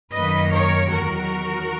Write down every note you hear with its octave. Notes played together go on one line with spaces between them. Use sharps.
F#2 D#3 A#3 B4 D#5
A#4 C#5
E2 D#3 F#3 F#4 A#4